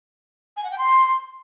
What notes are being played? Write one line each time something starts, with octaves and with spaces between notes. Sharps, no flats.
G#5
F#5
G5
C6